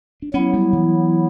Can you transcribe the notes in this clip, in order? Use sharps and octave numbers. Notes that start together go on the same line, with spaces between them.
D4
F#3 B3 C#4 E4
G3
E3